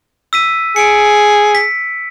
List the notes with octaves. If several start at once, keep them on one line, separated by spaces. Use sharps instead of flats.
E6 B6 D#7
G#4 C#7 D7
B6